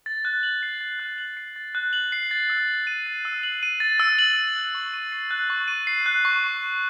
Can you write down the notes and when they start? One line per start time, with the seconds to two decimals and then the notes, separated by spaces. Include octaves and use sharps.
0.06 A6
0.25 F#6
0.43 F#7
0.63 C7
0.81 A6
1.00 F#6
1.18 F#7
1.37 C7
1.56 A6
1.75 F#6
1.93 F#7
2.12 C7
2.31 A6
2.50 E6
2.68 F#7
2.87 D#7
3.06 A6
3.25 E6
3.43 F#7
3.63 D#7
3.80 A6
4.00 E6
4.19 F#7
4.36 D#7
4.56 F#6
4.75 C#6
4.93 D#7
5.12 C7
5.31 F#6
5.50 C#6
5.68 D#7
5.87 C7
6.06 F#6
6.25 C#6
6.44 D#7
6.62 C7